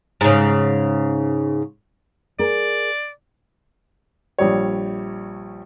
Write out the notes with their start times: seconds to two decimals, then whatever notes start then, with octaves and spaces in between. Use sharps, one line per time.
0.21 G#2 C#3
2.39 G#4 A#4 D5
4.39 A#1 G3 C#5